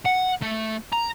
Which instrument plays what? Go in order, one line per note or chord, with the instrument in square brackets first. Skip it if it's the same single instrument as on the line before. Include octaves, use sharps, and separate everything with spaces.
[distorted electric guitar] F#5
A3
A#5